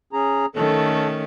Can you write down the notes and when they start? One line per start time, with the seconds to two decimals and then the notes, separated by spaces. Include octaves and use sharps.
0.13 C#4 G#4 A#5
0.56 D#3 A3 C#4 A4